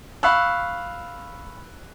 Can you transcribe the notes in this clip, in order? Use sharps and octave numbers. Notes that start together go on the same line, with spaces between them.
F5 B5 C#6 E6 F#6